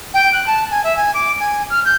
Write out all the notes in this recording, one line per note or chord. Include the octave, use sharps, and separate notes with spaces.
G5
F#6
A5
G#5
E5
G#5
D6
G#5
F6
G6